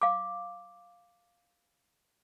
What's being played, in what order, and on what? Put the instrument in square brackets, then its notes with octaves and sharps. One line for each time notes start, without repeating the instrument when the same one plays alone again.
[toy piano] F5 D6